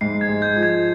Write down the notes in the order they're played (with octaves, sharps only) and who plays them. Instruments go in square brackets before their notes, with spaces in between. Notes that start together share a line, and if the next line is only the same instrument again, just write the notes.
[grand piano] G#2 [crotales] C7
[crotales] G#6
[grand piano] G#3
[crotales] G6
[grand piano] F3
[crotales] G#6